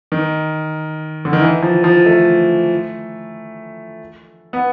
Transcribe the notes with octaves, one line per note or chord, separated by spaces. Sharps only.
D#3
D3
D#3
E3
F3
F3
A3
B3